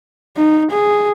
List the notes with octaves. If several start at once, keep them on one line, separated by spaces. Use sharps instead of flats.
D#4
G#4